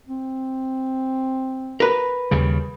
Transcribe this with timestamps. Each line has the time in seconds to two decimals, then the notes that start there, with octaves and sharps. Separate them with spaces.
0.07 C4
1.80 A#4 B4
2.31 D#2 C#3 G3